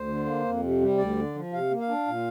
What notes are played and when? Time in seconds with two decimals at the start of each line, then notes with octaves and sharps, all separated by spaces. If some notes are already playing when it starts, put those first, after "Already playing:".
Already playing: D2 C5
0.08 D3
0.26 A#3
0.45 F2
0.63 C3
0.81 G3
0.98 D2 D5
1.16 D3
1.35 F3
1.53 C3 F5
1.71 A#3
1.80 F5
1.89 D4
2.07 A#2